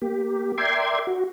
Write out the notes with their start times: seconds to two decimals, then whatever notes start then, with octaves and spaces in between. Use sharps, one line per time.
0.02 A#3 G4
0.58 A#4 D5 E5 G5 C6 G#6
1.07 F#4